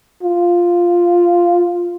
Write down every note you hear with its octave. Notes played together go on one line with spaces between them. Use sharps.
F4